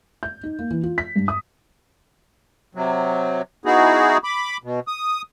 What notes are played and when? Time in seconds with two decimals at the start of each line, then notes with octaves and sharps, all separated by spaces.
0.23 G6
0.43 D#4
0.59 A#3
0.71 E3
0.83 F4
0.98 B6
1.16 G2
1.28 D#6
2.75 C3 F#3
3.65 B3 D#4 E4 F#4 G#4
4.24 B5 D6
4.64 B2
4.88 D#6